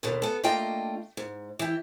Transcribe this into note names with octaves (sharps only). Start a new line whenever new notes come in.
D#2 B2 D3
B3 A4
A3 A#3 D4 F4 D#5 G5
G#2
E3 G4